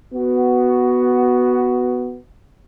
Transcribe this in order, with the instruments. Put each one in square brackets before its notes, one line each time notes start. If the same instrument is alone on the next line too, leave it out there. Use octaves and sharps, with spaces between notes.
[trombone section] B3 F#4